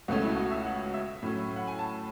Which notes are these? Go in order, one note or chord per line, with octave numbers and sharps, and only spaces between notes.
C#2 B2 A3 C#4 F#4
E4
F#4
E5
F#5
E5
A2 F#3 C#4
F#5
G#5
A5